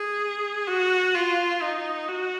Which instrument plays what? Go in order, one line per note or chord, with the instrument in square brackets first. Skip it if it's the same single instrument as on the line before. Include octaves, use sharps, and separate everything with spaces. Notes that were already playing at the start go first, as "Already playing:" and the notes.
Already playing: [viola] G#4
F#4
F4
D#4
F#4